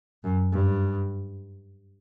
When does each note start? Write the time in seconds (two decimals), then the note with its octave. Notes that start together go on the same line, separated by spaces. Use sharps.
0.24 F#2
0.52 G2